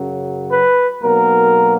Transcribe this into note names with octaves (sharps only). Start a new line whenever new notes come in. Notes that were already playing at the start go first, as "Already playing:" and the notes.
Already playing: F#2 C#3 F#3
B4
B1 B2 F#3 A#3 A#4